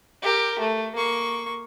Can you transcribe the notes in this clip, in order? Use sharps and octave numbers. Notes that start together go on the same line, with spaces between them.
G4 A#4
A3
A#3 C#6